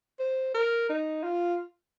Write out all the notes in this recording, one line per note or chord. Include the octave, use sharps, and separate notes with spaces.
C5
A#4
D#4
F4